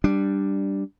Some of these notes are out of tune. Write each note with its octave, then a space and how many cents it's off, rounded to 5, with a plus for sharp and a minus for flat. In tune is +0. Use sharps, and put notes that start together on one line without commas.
G3 +0 D4 +0